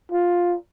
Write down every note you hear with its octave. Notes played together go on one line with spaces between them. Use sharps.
F4